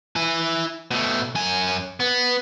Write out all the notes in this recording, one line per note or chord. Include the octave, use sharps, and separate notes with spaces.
E4 G#5
B2 A3
F#2 G#5
B3